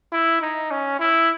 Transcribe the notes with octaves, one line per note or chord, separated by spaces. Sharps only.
E4
D#4
C#4
E4